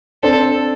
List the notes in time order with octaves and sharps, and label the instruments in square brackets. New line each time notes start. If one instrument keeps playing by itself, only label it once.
[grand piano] C4 D4 [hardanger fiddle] A4